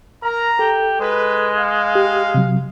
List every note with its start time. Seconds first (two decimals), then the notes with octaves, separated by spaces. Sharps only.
0.23 A#4 A#5
0.59 G4 A4
1.00 G#3 B4
1.56 F5
1.95 G4
2.34 C3 F#3